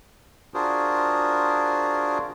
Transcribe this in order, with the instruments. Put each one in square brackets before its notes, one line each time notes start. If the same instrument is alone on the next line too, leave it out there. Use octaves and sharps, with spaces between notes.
[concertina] D4 F4 F#4 G#4 A#4 C5